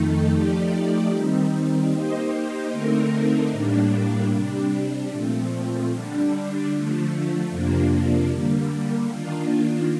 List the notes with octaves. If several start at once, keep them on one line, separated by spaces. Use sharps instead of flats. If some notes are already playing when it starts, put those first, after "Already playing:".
Already playing: F2 D#3 A3 D#4 A4
F3 A3 D#4 G4 D5
D#3 G3 C4 D#4
A#3 D#4 G4 C5 D#5
D3 A3 C4 D#4 A#4
A2 G3 A#3 D4
C3 G3 D4
A#2 F3 A3 C4
D3 G3 D4
D3 F3 A3
F2 C3 F3 A#3 D4
D3 G3 A#3
D#3 A#3 D4 F4